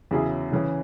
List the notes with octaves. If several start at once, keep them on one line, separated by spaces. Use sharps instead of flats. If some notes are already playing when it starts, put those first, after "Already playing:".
E2 C#3 F#3 E4 G#4
C#3 E3 C#4 G#4